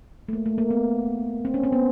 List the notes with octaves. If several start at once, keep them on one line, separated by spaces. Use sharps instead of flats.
A3
A#3
A3
A#3
B3
C4
C#4
C4
B3